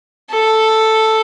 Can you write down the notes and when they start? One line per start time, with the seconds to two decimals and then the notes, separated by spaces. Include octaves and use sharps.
0.31 A4